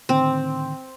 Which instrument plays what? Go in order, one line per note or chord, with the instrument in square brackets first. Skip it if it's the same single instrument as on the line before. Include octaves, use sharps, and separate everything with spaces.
[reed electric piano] A2 D3 D#3 [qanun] C4